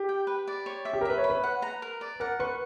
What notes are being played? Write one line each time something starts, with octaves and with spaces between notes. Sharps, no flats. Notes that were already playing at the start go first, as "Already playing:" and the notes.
Already playing: G4
G5
B4
D5
C#5
E5
G4
A#4
B4 E5
C#5
B5
B4
F#5
A#5
A#4
D5
A#4 F#5
B4 C#6